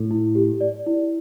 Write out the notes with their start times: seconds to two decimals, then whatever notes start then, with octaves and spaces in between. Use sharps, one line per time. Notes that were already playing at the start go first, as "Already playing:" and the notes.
Already playing: A2
0.11 E4
0.35 G4
0.61 D5
0.87 E4